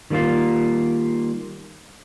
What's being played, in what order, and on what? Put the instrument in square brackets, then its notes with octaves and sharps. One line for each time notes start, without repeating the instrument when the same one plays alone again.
[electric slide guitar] D#3 G3 A#3 E4 F4